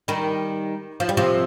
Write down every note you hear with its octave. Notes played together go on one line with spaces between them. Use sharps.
D#3 G3
F3
G3
C3 F3